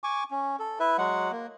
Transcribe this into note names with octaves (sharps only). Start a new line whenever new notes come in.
G#5 C#6 D6
C#4
A4
E4 B4 E5
F#3 G#3 F#5
A#3